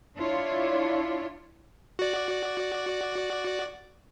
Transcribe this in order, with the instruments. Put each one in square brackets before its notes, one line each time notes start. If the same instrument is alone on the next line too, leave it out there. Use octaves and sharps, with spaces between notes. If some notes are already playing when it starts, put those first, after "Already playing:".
[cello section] D4 E4 F4 C#5
[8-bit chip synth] F#4 D5